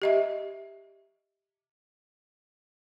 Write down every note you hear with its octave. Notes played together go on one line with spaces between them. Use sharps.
G4 D#5 E5